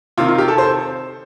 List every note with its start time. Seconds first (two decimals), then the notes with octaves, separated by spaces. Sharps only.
0.18 C3 D#3 F4
0.28 F4
0.38 G4
0.48 A4
0.58 C5